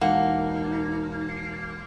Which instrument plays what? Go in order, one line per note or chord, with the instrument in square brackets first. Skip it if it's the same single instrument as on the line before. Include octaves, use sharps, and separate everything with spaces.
[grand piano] E1 [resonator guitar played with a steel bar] A#3 [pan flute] D#4 [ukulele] F#5